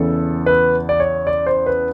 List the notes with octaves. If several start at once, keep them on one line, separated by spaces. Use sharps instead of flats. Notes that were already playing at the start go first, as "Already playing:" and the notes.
Already playing: E2 C#3 E3 A4
B4
D5
C#5
D5
C5
B4